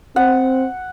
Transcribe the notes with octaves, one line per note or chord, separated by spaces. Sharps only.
C4 F#5